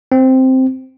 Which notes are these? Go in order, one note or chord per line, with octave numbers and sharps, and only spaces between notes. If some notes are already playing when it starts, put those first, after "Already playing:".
C4